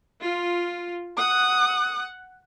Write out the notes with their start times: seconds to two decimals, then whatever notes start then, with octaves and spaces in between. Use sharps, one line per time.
0.22 F4
1.17 F#5 D#6